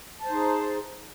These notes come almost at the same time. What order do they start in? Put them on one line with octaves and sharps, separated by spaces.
A5 C5 D#4 G#4